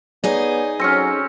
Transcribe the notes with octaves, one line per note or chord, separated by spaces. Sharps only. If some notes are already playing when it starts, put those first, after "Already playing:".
B3 D#4 G#4 C#5 D5
F#3 C4 C#4 A#6 C#7